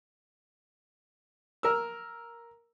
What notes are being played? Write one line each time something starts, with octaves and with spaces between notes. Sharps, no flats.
A#4 E6